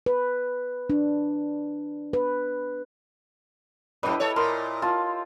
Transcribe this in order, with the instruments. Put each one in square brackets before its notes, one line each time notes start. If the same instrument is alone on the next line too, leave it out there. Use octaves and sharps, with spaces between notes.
[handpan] B4
D4
B4
[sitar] F#2 A2 [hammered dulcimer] E4 G4 D#5 [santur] B4
[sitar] A4 C#5 [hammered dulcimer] A5
[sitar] A#2 [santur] A#4 C6 D#6
[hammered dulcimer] F4 [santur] A5